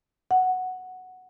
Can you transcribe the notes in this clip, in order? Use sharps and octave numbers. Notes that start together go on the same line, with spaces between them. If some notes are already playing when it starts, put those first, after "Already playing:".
F#5